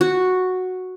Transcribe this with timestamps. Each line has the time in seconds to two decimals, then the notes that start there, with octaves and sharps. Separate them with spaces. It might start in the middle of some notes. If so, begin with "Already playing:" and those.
0.01 F#4